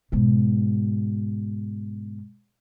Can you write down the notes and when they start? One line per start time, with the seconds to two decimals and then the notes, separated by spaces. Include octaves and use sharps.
0.12 G#2 B2